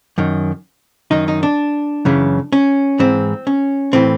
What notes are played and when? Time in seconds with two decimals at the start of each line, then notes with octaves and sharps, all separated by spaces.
0.18 F#2 D#3
1.11 F#2 D#3 D#4
1.28 D#4
1.43 D4
2.05 F#2 C#3 E3
2.53 C#4
2.99 G#2 E3 C4
3.47 C#4
3.93 A2 E3 C4